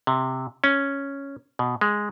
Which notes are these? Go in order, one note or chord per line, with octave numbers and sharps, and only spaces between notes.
C3
C#4
B2
G#3